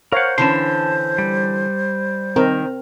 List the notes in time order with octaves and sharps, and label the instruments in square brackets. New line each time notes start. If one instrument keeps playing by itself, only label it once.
[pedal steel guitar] A#4 F#5 [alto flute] C5 [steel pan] C#5 F5
[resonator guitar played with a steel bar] D3 E3 C#4 [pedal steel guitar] A5 C6
[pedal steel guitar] G3
[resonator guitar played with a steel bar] D#3 [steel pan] C4 A#4